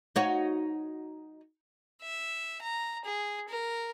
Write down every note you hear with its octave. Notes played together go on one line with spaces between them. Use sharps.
D#4 F#4 C#5
E5
A#5
G#4
A#4